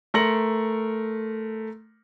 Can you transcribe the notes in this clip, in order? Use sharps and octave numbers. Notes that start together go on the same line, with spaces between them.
A3 A#4 C6 A#6 C#7 F#7